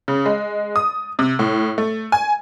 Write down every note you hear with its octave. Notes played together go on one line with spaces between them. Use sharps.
C#3
G#3
D#6
C3
A2
A3
G#5